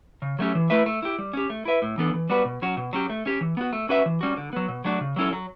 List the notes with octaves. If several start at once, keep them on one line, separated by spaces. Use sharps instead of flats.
C#3
F#3 A3 C#4 G4
E3
A3 E4 B4 E5
A3
E4 G4
G3
C#4 G4
A3
E4 B4 E5
A2
E3 B3 D4 A4
E3
G3 B3 F#4 B4
B2
F#3 C#4 F#4
B2
F#3 C#4 G4
A3
C#4 G4
E3
B3 F#4
A3
C#4 F#4 B4 E5
E3
G3 C#4 F#4
D3
F#3 B3
B2
F#3 A3 D4 F#4
C#3
F#3 C#4 E4 A4
F#3